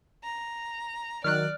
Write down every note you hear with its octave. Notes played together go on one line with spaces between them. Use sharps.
A#5
D#3 F#3 D5 F6 F#6